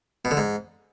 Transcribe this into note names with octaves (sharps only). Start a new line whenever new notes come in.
B2
D3
G#2